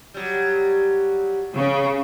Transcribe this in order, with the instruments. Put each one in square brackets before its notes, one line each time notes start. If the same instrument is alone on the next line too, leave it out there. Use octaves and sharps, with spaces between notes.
[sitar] F#3 G3
[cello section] C#3